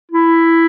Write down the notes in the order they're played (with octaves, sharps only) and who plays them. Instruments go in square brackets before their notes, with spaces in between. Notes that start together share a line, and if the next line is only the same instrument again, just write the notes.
[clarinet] E4